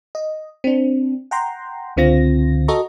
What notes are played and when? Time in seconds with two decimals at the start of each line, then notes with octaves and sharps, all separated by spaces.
0.15 D#5
0.64 C4 D4
1.31 F#5 G5 A#5 C6
1.96 C#2 D3 C4 F4 A#6
2.68 F#4 A4 D#5 A#5 C#6